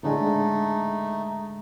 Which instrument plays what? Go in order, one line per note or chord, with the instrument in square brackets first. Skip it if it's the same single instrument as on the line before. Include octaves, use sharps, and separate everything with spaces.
[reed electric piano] A2 D3 G#3 [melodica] A3 D#4